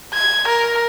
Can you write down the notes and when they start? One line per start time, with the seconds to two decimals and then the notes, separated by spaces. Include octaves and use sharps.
0.14 G#6
0.48 A#4